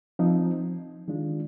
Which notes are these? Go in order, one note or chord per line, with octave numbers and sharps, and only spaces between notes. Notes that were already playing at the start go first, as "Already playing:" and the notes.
F3 C4 D#4
D#3 G#3 D4 F4